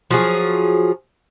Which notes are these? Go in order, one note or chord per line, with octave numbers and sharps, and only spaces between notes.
F3 F#3 G#4